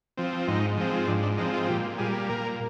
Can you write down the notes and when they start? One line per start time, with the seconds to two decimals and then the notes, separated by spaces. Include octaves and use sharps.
0.17 F3 C4
0.48 G#2 D#4
0.77 F3 G#3 C4
1.08 G#2 D4
1.23 D4
1.38 F3 G#3 C4 D#4
1.53 F4
1.69 A#2 G4
1.98 G3 A#3 G#4
2.29 A#2 A#4